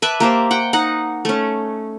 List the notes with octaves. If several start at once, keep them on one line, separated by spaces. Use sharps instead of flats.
B4 D5 E5 A5
A#3 G4 C5
F#5 G5
D#4 F#5
A3 C#4